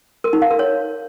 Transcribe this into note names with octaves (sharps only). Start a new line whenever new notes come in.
A#4
D#4
F5
A#4
C#5